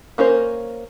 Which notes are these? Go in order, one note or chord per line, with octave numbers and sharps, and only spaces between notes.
A#3 C#4 A#4 C5